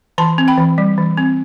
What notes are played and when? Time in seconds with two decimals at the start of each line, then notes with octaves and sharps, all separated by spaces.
0.18 E3 A5 C6
0.38 C4
0.48 G5 B5
0.58 E3
0.78 G3
0.98 E3
1.17 C4